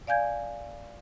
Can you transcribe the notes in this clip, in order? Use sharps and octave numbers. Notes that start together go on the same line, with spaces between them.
D5 F5 G#5 G6 G#6